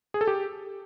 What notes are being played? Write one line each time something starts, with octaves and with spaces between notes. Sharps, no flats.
G#4
A4
G4